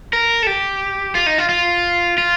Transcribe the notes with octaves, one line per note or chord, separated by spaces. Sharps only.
A#4
A4
G4
F4
D#4
F4
F4
F4